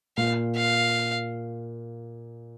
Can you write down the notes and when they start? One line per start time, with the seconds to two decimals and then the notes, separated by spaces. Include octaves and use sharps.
0.17 A#2 F5
0.56 F5